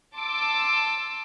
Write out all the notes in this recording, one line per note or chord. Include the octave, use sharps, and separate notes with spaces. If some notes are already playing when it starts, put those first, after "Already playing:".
A5 C6 D6 E6